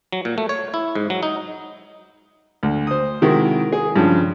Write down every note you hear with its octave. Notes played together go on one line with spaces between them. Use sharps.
F#3
A#2
A3
C#5
E4
G#2
F#3
D#4
D2
C5 D#6
C3 D#3 G#3 E4 F#4
G#4
G2 C#3 F3